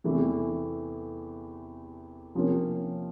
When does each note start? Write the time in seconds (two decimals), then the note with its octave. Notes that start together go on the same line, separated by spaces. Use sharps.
0.04 E2 C3 E3 A3
2.35 C3 F3 A#3 C#4